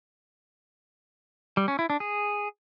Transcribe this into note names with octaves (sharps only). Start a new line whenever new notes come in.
G3
C#4
E4
D4
G#4